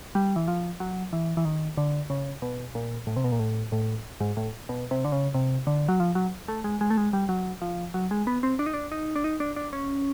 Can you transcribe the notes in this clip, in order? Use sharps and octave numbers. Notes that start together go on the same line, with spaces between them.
G3
E3
F3
F#3
E3
E3
D#3
D3
C#3
B2
A#2
A2
C3
B2
A#2
A2
A2
G#2
A2
B2
C3
D3
C#3
C3
D3
F#3
F3
F#3
A3
G#3
G#3
A3
G#3
G3
F#3
F3
F#3
G#3
B3
C4
D4
D#4
D4
D#4
D4
D#4
D4
D4
C#4